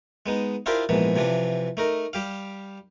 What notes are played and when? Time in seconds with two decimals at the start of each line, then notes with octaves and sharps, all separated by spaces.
0.26 G#3 B3 D#4
0.66 D4 E4 F4 G4 A#4 C5
0.89 A#1 G#2 E3 B3
1.16 C3 E3 F3 D4
1.77 A3 D#4 A#4
2.13 G3 G4 F5